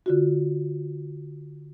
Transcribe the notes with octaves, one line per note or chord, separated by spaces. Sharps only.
D3 F4 F#4